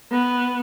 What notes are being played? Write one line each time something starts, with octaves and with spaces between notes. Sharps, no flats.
B3